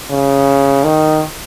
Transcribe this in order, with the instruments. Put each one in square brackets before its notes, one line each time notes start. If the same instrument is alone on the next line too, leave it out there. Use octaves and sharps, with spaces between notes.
[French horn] C#3
D#3